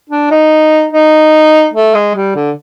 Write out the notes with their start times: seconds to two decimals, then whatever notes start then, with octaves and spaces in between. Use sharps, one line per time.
0.10 D4
0.31 D#4
0.93 D#4
1.74 A3
1.94 G#3
2.15 G3
2.35 D3